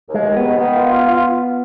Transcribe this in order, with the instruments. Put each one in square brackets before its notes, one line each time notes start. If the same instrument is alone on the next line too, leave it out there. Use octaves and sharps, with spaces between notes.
[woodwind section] D#2
[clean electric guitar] G#3
[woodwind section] D#2
[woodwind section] D#3 [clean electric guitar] B3
[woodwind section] D#3 [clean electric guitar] B3
[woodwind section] F4
F4
F4